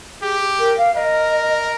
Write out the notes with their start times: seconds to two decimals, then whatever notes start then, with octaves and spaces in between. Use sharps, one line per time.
0.22 G4 G#4
0.59 A#4
0.78 F5
0.96 A#4 D#5